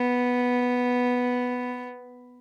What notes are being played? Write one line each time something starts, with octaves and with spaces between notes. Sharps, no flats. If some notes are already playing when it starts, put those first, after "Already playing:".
Already playing: B3